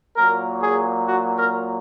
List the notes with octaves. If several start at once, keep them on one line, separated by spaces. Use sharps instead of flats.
A#2 F#3 A#3 A#4
G#4
F#4
A#4